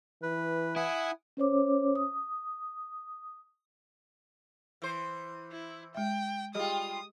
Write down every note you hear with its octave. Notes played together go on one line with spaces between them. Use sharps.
E3 B4
E4 F#5 G#5 D#6
C#4 C5 C#5 D6
D#6
E3 C5
E4
G#3 E5 G5
G3 F4 G4 G#4 D#5 D#6